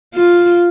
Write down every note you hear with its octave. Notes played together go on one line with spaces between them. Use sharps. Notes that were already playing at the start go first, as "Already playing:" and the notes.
F4